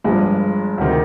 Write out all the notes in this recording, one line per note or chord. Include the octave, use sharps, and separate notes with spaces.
G1 G2 F3 G#3
D2 C3 D#3